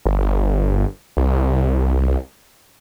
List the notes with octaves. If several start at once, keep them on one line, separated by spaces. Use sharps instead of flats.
G1
C2